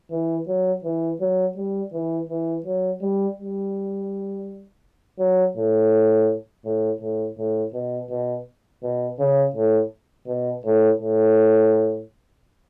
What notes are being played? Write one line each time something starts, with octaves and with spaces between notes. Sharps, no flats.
E3
F#3
E3
F#3
G3
E3
E3
F#3
G3
G3
F#3
A2
A2
A2
A2
B2
B2
B2
C#3
A2
B2
A2
A2